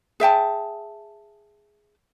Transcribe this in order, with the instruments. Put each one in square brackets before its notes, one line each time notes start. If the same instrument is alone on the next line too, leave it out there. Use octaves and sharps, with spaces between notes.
[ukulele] G#4 E5 G5 A5